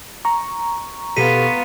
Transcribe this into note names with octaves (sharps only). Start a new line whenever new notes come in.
A#5 C#6
B2 B3 F4 G4 A4 B6 D#7